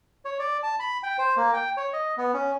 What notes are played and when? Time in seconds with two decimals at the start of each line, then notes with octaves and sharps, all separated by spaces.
0.25 C#5
0.39 D5
0.63 A5
0.80 B5
1.03 G5
1.18 C5
1.37 A#3
1.53 G5
1.77 C#5
1.93 D#5
2.18 B3
2.34 C#4